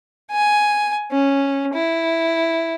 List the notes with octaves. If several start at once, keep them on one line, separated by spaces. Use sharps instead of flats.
G#5
C#4
E4